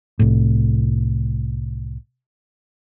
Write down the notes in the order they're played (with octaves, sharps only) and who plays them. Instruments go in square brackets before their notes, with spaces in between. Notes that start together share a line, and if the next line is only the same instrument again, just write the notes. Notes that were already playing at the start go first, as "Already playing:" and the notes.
[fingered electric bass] C2 A2